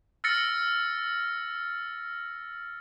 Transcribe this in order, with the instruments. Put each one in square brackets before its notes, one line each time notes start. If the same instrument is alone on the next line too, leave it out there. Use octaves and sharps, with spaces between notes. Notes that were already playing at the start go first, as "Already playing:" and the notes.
[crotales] E6 F6 A6 A#6 C#7